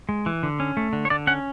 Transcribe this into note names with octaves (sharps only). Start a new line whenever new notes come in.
G#3
E3
D3
C#4
A3
D3
C#5
D3 D5
C#4 F#5